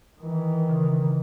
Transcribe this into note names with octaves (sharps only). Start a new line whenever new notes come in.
D#3 E3
C#3